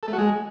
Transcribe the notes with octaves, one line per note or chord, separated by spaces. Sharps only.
A4
A3
F#4
G#3